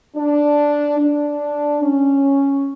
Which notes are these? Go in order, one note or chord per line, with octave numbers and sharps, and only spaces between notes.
D4
D4
C#4